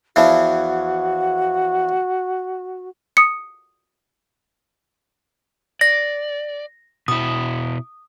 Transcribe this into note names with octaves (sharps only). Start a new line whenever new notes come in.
E2 E3 F3 F#4
D#6 C#7
D5 A#6
B2 E4 D#6